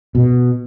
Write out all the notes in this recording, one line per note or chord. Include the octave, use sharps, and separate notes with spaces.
B2